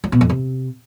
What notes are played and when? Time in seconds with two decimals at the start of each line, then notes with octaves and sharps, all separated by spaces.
0.04 F#3
0.12 B2
0.21 F2
0.30 C3